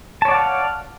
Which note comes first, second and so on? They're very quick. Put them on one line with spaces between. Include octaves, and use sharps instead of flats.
A5 C#5 D5 F#5 F5